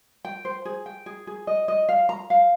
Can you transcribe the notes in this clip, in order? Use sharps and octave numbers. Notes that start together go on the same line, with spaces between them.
G5
C5
G#4
G5
G#4
G#4
D#5
D#5
F5
A#5
F5